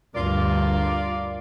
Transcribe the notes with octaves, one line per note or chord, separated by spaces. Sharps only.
D2 G2 F4 A#4 D5